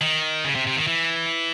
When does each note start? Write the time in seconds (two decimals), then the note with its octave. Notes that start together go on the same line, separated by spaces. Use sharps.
0.01 D#3
0.45 C#3
0.55 C3
0.67 C3
0.76 D#3
0.87 E3